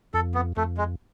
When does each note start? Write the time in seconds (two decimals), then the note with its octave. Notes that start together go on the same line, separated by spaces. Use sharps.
0.14 F2 A4
0.35 B3
0.57 F2 A3
0.77 G#3